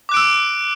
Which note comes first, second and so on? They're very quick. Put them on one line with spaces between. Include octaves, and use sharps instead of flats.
D6 F#6 D7 E6